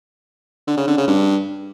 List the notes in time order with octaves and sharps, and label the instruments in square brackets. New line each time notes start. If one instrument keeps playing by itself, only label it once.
[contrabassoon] D3
C#3
D3
C#3
G2